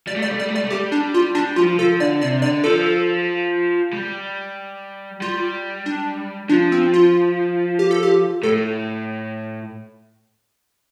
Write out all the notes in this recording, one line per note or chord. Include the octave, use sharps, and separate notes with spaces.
G3 D5
A3
G3 D5
A3
G3 D5
A3
G3 D5
A3
G3 G4
D4
F4
G3 D4
F3 F4
F3 A4
D3 D5
C3 D5
D3 D5
F3 A4
G3
G3 F4
D4
F3 D4
C4
F4
G4
A4
G4
A2 A4